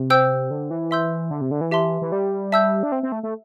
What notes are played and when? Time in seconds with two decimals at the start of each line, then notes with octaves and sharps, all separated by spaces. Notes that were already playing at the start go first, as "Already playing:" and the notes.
Already playing: C3
0.10 C5 G5 E6 G6
0.51 D3
0.71 E3
0.91 E5 C6 E6 G6
1.31 D3
1.41 C3
1.51 D3
1.61 E3
1.71 G4 E5 A5 C6
2.02 E3
2.12 G3
2.52 E5 A5 E6 G6
2.83 D4
2.92 C4
3.03 C4
3.12 A3
3.23 A3